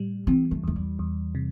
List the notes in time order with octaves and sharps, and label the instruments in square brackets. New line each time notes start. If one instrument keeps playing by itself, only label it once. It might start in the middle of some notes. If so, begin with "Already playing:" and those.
Already playing: [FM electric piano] A2 G3
[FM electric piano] E3 [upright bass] C4
[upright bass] A3
[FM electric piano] E2 [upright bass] A3
[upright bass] G3
[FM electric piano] E2
C3